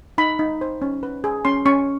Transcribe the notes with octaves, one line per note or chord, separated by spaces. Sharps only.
D#4 B5
D#4
C5
C#4
B4
G#4
C#4 C6
C#4 C#6